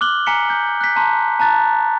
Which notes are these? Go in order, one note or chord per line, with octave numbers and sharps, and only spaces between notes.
D6 F6 F#6 F#7 G7
G#5 A#5 B6 C#7 G7
G6
F#6 B6
A5 A#5 C6
A5 A#5 F#6 A6